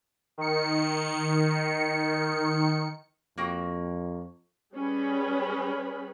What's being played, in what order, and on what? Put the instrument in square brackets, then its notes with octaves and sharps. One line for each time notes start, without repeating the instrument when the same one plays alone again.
[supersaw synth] D#3 C#7
[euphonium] F2 [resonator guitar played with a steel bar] A#3 F#4 G5
[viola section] G3 C#4 G#4 B4 B5